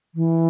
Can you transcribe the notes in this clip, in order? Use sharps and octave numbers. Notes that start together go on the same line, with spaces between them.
E3